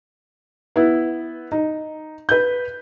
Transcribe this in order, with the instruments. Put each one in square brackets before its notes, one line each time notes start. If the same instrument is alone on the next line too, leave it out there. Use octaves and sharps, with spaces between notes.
[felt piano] B3 E4
D#4
B4 G6